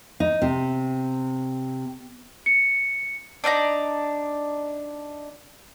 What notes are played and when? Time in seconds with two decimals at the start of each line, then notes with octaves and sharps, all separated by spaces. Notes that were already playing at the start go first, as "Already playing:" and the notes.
0.20 D#4
0.42 C3
2.46 C#7
3.44 D4 D#4 D5 A#5